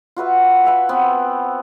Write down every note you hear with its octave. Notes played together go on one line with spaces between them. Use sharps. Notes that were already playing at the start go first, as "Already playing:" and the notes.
F4 F#4 B4 E5
B4 E5 G#5 B5
B3 C4